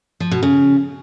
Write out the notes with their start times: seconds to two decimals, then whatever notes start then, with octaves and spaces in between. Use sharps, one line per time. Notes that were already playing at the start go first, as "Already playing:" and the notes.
0.20 F3
0.31 B2
0.43 C#3